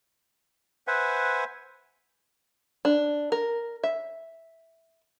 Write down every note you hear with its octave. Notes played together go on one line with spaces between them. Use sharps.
B4 C5 E5 F#5 G#5
D4
A#4
E5